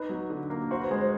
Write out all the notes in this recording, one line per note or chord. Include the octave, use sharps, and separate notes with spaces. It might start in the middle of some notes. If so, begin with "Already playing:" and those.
Already playing: D#4 B4
F#3
D3
A#3
F#4 C5
B4
G#3 C5
C5